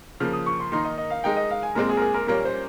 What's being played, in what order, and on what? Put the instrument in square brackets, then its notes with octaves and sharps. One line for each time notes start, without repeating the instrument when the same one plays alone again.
[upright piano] C#3 F3 A#3 [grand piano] F6
[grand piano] D#6
C#6
C6
[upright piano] D#3 A#3 D#4 [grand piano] C6
[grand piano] D#5
D#5
F5
[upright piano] G#3 D#4 A#4 [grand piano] G5
[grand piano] D#5
F5
G#5
[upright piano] A#2 G#3 C4 [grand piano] A#4
[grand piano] G#4
A#4
G#4
A#4
[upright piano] A#2 G3 A#3 C#4 [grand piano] A#4
[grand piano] C5